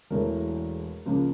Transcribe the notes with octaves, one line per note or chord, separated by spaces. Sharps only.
E1 E2 E3 A3 A#4
C#2 C#3 F3 A#3